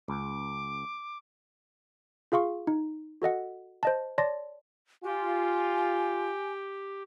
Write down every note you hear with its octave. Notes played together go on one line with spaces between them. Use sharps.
C#2 D6
F4 G#4 F5 C6 C#6
D#4
F#4 A4 D#5 F#5
C5 D#5 A5
C#5 D5 A5 C6 A6 A#6
F4 G4 G#5